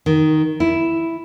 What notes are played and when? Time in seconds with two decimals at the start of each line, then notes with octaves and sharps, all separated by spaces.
0.06 D#3
0.60 E4